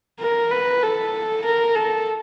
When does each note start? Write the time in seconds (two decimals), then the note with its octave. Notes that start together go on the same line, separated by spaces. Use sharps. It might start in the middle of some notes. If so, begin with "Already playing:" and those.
0.20 A#4
0.51 B4
0.82 A4
1.45 A#4
1.75 A4